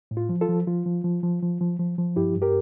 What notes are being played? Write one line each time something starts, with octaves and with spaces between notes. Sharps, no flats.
A2
F4
F3
F4 A4
F3
F3 F4
F3
F3
F3
F3
F3
F3
F3
G2 E4 G4
G2
G4 A#4